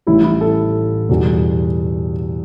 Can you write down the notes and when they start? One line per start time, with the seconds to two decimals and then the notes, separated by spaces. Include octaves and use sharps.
0.07 A1 A2 E3 G3 E4
0.24 E4
0.41 A4
1.09 E2 B2 G3